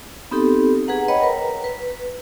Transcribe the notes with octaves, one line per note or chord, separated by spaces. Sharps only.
B3 C4 D#4 G4 A4
G#4 B4 F#5 A#5
B4 C#5 D#5 F#5 G5 B5
A#4 B4 A#5
B4